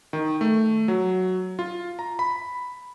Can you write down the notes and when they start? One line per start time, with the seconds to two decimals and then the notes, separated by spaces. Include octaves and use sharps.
0.13 D#3
0.41 A3
0.88 F#3
1.59 F4
1.99 A#5
2.19 B5